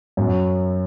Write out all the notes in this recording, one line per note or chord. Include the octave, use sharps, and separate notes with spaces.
F#2